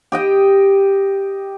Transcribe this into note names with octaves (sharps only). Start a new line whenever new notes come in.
G4 D#5 G5